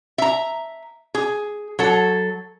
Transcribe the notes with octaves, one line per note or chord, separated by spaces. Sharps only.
E5 A#5
G#4
F#3 A4